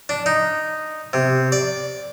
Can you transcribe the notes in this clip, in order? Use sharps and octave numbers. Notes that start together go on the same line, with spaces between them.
D4
D#4
C3
D5